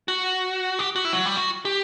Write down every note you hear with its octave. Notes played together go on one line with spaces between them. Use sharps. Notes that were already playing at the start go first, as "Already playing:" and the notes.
F#4
G4
F#4
E4
F#3
G3
F#4
G4